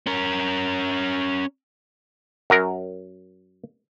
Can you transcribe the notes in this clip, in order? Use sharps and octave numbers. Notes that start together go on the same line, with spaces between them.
C#4 A#4
F#2 F#3 A#4